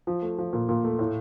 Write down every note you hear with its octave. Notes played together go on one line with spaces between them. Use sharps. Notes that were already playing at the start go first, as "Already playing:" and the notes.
F3
A3
F3
A#2
A#2
A3
A2